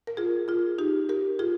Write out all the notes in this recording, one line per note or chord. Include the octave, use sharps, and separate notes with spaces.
A#4
F4 G#4
F4 G#4
D#4 G4
G4 A#4
F4 G#4